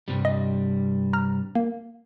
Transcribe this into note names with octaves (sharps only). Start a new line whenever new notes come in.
G2 C3 G3
D#5
A#5 F6
A#3